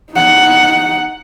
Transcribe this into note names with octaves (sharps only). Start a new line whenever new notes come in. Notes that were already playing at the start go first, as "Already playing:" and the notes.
D#4 F#5